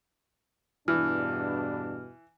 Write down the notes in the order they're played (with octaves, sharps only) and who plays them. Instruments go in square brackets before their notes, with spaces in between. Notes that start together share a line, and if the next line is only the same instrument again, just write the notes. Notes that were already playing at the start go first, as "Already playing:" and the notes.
[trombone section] E2 G2 B2 [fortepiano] E3 [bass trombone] D4 [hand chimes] F6